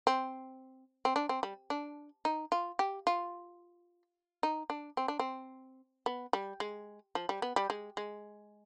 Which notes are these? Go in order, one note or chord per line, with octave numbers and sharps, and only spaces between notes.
C4
C4
D4
C4
G3
D4
D#4
F4
G4
F4
D#4
D4
C4
D4
C4
B3
G3
G#3
F3
G3
B3
G3
G#3
G#3